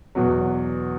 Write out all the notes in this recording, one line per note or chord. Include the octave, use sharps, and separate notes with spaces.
E2 B2 F#3